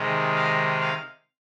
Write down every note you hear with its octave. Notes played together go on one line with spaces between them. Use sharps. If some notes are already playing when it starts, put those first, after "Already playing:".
Already playing: C3 D#3 G#3
F5
F5